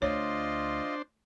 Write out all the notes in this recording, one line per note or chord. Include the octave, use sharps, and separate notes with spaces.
D2 D4 F4 C5 C#5 D#5